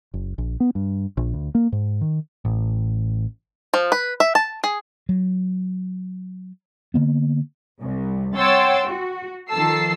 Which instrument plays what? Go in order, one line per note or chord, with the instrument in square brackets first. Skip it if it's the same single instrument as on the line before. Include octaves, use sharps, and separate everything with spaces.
[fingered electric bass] F#1
A#1
B3
G2
A#1
D2
A#3
G#2
D#3
[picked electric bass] A1
[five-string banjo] F3
B4
E5
A5
G#4
[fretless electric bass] F#3
D3 A#3 B3
[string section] C2
C#5 F#5 G5 C6 E6 A6
F#4
D#3 F3 A4 A5 E6 C7